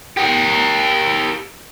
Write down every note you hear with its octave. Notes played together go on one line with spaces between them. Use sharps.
G4 A#4